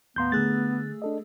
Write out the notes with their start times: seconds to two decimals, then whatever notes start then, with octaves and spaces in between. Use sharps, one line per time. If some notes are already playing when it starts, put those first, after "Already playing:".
0.16 D#2 A2 B3 F5 A#5 C6 G6
0.32 D3 A3 G#4 E6 F#6 A6
1.02 D4 A4 D#5